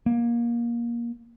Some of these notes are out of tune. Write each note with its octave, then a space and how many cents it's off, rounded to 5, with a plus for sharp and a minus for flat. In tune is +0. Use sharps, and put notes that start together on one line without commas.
A#3 +20